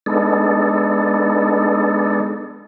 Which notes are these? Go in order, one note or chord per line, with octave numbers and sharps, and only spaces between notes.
G#3 B3 D4 D#4 A4